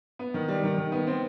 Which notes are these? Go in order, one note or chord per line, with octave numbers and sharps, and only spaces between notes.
B3
D#3
G3
D#3
D#3
B3
C4